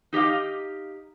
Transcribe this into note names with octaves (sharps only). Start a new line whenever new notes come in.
D#4 G4 D#5 F5